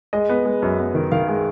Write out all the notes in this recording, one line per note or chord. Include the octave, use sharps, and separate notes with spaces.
G#3 D#5
B3
G#3
F#2
B3
D#3
D#3 F5
G#3